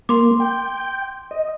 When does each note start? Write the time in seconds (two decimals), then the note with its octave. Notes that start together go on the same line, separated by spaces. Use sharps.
0.09 A#3 C6 D6
0.40 G5
1.31 D#5